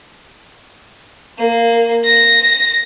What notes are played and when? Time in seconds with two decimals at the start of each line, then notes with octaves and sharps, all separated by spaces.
1.39 A#3
2.04 A#6